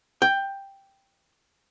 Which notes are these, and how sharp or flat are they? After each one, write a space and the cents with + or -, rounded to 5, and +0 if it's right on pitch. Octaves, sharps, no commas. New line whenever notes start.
G5 +5